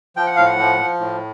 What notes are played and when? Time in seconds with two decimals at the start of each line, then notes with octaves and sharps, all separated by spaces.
0.16 F3 G5
0.27 F#5
0.36 A2 F5
0.46 F#5
0.58 F3
0.79 F3
0.99 A2